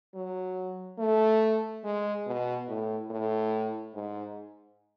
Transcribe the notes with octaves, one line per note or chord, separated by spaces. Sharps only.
F#3
A3
G#3
B2
A2
A2
G#2